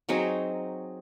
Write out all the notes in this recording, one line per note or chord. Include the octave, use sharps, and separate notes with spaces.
F#3 C4 D#4 G#4